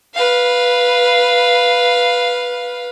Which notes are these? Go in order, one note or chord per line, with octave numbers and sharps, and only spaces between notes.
B4 F5